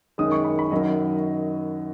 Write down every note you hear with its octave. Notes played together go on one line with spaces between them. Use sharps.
F#2 D#3 G#3 D#6
C#6
B5
B5
F#2 D#3 F#3 D#5